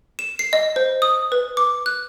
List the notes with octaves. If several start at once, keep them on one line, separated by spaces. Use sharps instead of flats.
E7
C7
D#5
C5
D#6
B4
D6
F#6